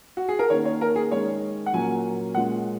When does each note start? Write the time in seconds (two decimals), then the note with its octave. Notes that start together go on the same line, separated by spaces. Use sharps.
0.17 F#4
0.29 G#4
0.39 A#4
0.50 D#3 A#3 C#4 C#5
0.65 C#5
0.81 A#4
0.96 G#4
1.12 D#3 G#3 C#4 C#5
1.66 F#5
1.73 A#2 F#3 A#3 C#4 G#5
2.34 A#2 G#3 C#4 F#5